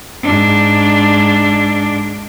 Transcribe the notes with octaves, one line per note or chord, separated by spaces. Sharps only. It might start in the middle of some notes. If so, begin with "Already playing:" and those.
G#2 D4